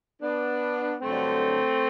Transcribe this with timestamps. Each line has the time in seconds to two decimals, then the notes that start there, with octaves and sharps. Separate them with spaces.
0.22 B3 D4
1.01 G2 D3 F#3 A3 C4